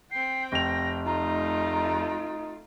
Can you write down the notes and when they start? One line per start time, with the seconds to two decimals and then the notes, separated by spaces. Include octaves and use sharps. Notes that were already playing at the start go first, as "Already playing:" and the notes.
0.11 C4 G5 C7
0.52 F1 A#6 F7
1.06 A3 D#4 F4 A#5